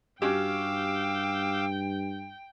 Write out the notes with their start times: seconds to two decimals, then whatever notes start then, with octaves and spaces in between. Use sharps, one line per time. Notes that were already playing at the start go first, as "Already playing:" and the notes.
0.22 G2 C#4 F#4 G4 F5 G5 D6 E6